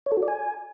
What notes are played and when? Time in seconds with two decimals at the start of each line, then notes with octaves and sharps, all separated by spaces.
0.06 C#5
0.12 A4
0.17 F#4
0.22 D5
0.28 G#5